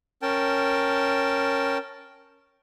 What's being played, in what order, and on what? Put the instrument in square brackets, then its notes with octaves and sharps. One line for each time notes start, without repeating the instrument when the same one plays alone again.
[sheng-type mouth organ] C#4 A#4 G5 A5